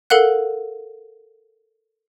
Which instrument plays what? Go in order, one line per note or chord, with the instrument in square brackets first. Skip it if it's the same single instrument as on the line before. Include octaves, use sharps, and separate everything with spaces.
[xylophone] A4 A#4 F5 F#5 F#6